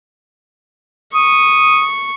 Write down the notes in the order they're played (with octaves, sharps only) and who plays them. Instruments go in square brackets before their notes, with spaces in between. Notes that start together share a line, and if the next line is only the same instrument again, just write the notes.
[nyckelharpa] C#6 [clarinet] D#6